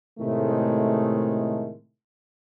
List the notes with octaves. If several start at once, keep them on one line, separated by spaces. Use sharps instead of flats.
A2 C3 D#3 G#3 A3